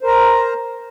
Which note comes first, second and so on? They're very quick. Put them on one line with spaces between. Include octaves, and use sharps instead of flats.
C5 A#4 A#5